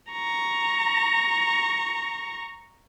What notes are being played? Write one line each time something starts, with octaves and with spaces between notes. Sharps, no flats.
A#5 C#6